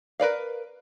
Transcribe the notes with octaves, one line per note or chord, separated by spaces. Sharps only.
A#4 B4 D5 F5